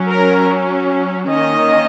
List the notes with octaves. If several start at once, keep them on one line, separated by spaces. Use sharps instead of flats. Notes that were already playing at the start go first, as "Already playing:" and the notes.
Already playing: F#3 C#4
A#4
D#3 A#3 C#4 D#5